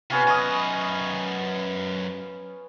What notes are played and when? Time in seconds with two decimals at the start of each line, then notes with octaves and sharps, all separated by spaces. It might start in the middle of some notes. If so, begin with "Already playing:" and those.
0.10 C3 B3 C#4 F4
0.27 F#2 C#4 C#5 D#5 D#6